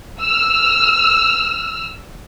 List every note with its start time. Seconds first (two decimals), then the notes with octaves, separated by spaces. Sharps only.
0.20 E6 F6